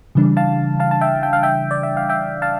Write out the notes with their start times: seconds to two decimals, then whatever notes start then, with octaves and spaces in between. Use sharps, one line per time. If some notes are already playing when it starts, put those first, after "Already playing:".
0.15 C#3 E3 G3 D4
0.37 F5 A5
0.80 F5 A5
0.91 A5
1.01 E5 G5
1.23 G5
1.33 F5
1.43 E5 G5
1.71 D5
1.83 E5
1.97 F5
2.09 E5 G5
2.42 F5 A5